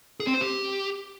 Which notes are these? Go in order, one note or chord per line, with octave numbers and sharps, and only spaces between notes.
G#4
C4
C5
G4